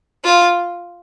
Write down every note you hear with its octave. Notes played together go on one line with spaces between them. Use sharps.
F4